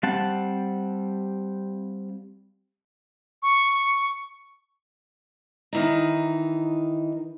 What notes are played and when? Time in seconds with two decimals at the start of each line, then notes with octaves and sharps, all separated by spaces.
0.03 G3 C4 F5 F#5 A5
3.43 C#6
5.73 D#3 E3 D#4